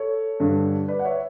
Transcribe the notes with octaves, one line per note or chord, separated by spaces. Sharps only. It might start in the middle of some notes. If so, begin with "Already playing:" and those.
Already playing: A4 C#5
G2 D3
B4 D5
F#5
C#5 E5